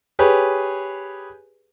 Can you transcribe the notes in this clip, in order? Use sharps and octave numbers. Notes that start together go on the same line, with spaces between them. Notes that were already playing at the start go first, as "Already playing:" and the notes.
G4 G#4 B4 C#5